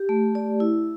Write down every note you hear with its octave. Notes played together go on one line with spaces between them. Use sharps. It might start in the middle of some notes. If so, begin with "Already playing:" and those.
Already playing: G4
A3
D5
E4